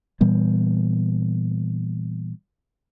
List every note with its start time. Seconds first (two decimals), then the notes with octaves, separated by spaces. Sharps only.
0.21 A#2 E3 G3 B3